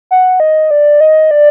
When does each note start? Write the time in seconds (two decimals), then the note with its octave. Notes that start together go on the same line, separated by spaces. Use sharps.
0.11 F#5
0.40 D#5
0.71 D5
1.00 D#5
1.31 D5